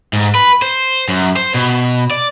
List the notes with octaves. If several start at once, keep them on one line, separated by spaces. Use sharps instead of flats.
G#2
B4
C5
F#2
C5
B2
D5